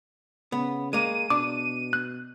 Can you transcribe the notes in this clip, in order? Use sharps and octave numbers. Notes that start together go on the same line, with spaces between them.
C#3 B3
G#3 A#3 D#7
B2 D4 D6
F#6